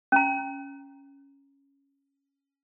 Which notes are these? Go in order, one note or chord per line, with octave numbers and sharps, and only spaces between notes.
C#4 A#5